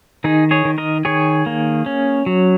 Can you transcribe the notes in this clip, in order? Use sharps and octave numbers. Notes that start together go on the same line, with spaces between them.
D#3 D#4 G#4
G#4 C#5
D#3
A#4 D#5
D#3 G#4 C#5
A#3
C#4
F#3